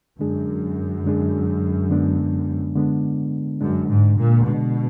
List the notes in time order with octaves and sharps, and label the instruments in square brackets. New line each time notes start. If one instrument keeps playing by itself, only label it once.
[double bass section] F#2 [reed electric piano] D3 G#3 D4 G#4
[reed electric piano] D3 G#3 D4 G#4
D3 G#3 B3 D4
D3 G#3 B3 D4
[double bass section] F#2 [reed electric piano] D3 G#3 D4
[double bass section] G#2
A#2
[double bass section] B2 [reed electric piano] D3 G#3 D4